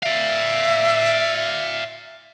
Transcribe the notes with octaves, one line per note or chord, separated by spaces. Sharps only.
D5 E5 F5